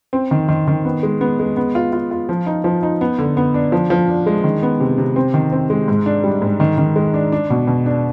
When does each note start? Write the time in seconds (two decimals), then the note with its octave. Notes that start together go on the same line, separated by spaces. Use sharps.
0.13 C4
0.31 D#3
0.48 D#3
0.67 D#3
0.85 B3
1.03 G#3
1.21 B3
1.39 G#3
1.57 B3
1.75 F4
1.93 F4
2.11 F4
2.29 F3
2.47 D#4
2.64 F3
2.83 D#4
3.01 B3
3.18 D3
3.37 B3
3.54 D4
3.72 F3
3.90 F3
4.09 D4
4.26 G#3
4.44 D#3
4.63 B3
4.80 C3
4.98 C3
5.16 C4
5.34 D#3
5.52 C4
5.70 G#3
5.88 G#2
6.06 D4
6.24 G3
6.42 G#2
6.60 D#3
6.78 D#3
6.96 G#3
7.14 D4
7.32 D4
7.50 B2
7.67 B2
7.86 D4